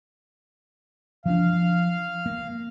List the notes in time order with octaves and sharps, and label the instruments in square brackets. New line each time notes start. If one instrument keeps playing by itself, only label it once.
[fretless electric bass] F3 C#4 D4 [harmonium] F5
[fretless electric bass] A#3